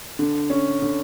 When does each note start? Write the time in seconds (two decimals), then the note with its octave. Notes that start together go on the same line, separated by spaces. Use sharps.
0.19 D3
0.50 C#4
0.82 D3